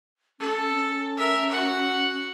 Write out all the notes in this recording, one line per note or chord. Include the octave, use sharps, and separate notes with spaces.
C#4 A4
C#4
A#4 E5
F#4 F#5